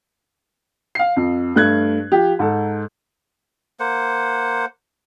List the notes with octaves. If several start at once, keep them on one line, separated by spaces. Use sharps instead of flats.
F5 C7
F2
G2 A3 F#6 G#6
F3 G4
G#2 A4
A#3 C5 F#5